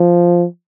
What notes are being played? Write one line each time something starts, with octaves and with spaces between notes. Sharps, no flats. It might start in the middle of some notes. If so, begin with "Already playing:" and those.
Already playing: F3